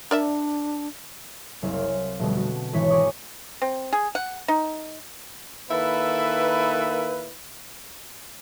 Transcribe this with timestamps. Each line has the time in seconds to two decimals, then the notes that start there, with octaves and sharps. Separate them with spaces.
0.11 D4 A#4 D5 E5
1.62 F#1 C2 C5 F5
1.74 F6 C7
2.19 F1 B2 D3 G3
2.36 F#4
2.73 G#1 E3 C#5 B6
2.90 G#4 A#4 D5 C#6 D#6
3.62 C4
3.93 G#4
4.15 F#5
4.48 D#4
5.70 D#3 A#3 E4 A4 B4